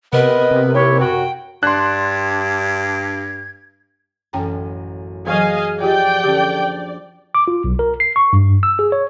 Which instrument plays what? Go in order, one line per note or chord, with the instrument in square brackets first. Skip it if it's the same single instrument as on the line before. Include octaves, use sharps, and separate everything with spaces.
[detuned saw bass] C3 [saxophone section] B3 B4 [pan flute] A#4 [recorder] D#5
[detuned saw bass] C3
[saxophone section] D#2 E4 G4 [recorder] C#5
[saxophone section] F#2 F#4 [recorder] G5
[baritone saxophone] G2 [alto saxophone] D4 [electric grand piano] C6 F#6 [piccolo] G#6
[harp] A1 F#2 [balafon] C#4 G5 A#5
[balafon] E3 F#3 [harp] A#3 G#4 [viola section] D#5 F5 G#5
[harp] F3 [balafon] F4 G4 D#5 [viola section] D5 [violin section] G5
[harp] D3 [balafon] C#4 G4
[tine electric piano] D6
F4
B1
A#4
C7
C#6
G2
E6
G#4
C#5